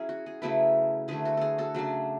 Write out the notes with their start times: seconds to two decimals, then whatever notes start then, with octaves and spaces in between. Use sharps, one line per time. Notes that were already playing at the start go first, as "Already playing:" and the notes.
Already playing: F#3 C#4 E4 G#4
0.09 F#4
0.26 G#4
0.42 C#3 F#3 A3 E4 G#4 B4
1.08 D3 F#3 A3 G#4 B4
1.25 F#4 A4
1.37 G#4 A4
1.58 F#4 A4
1.74 C#3 F#3 A3 D4